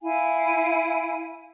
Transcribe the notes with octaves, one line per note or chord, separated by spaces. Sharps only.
E4 F5 G#5